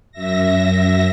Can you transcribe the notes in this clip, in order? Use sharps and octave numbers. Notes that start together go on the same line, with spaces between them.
F#2 E5 A#6